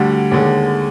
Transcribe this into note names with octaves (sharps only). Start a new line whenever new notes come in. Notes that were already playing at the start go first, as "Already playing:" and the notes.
Already playing: D2 D3 G3
D#2 D3 G#3